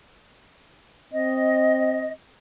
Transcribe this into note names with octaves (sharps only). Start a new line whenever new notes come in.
C4 D#5